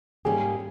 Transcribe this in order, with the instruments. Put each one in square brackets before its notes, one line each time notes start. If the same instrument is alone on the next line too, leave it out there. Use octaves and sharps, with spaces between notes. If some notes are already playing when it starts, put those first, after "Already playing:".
[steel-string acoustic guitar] G#2 G3 A#3 C#4 G4 [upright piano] G#4